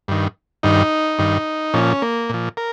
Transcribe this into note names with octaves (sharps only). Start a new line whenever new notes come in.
G2 D#3
G2 D#3 D#4
G2 D#3
A#2 F3 C#4
A#3
A#2 F3
A#4